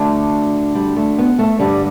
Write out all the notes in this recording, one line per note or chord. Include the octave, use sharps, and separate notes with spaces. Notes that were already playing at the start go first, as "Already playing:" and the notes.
Already playing: D2 D3 A3
G3
A3
B3
A3
G2 D3 G3